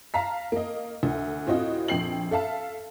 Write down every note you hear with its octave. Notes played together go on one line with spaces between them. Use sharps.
F5 A5 A#5 B6
A#3 D#5
D2
A2 C4 F4 F#4 D#5
A#1 F2 G5 C7 F#7
A4 E5 F5 A5